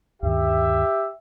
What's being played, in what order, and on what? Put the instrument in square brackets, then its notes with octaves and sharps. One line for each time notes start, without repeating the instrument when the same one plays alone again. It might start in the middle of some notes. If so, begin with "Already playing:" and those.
[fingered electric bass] D2 G2 D#3 [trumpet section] G4 E5